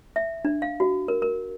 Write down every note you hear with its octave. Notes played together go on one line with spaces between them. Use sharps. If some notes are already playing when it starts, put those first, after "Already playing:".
E5
D4
F5
F#4
A#4
A#4